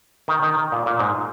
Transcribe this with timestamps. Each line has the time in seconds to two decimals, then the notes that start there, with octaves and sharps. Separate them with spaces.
0.28 D#3
0.43 D#3
0.72 A#2
0.86 A#2
0.99 G#2